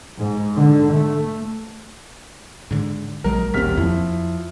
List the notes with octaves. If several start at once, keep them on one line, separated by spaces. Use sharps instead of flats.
G#2
D3
A3
G#2 D3
A#1 F#3 G#3 A#4
D#1 A1 C4 F6 B6
F2 F3 E4